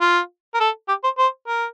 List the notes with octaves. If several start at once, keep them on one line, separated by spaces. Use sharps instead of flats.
F4
A#4
A4
G4
C5
C5
A#4